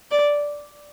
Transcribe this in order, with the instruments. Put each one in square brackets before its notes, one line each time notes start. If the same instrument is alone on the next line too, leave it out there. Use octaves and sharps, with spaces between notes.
[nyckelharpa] D5